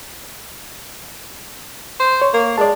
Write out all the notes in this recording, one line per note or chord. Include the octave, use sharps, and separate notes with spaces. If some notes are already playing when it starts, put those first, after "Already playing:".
C5
C#5
A#3
G#3 D5 A5